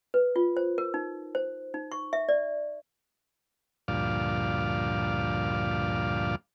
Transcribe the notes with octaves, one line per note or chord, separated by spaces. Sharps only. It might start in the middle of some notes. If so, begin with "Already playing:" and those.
B4
F4
C5
A#4
D#4
C5
D#4
C#6
E5
D5
D2 G2 A#2 F3 D5 F5